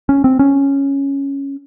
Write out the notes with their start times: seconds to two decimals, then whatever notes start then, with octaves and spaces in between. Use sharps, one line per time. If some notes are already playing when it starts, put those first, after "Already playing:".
0.09 C#4
0.24 C4
0.39 C#4